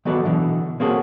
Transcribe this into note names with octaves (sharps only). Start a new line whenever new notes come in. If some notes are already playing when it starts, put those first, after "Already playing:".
D#3 F#3 B3 F#4 A4 D5
B2 D3 E3
A#3 C4 C#4 F#4 G#4 A4